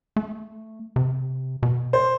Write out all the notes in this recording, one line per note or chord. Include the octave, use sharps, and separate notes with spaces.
A3
C3
B2
C5